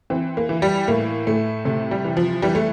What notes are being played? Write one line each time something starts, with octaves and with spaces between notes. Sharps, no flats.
E3 C4
A#3
E3
G3
A2 A#3
A2 A3
C3 A3
G3
E3
F3
E3 G3
A3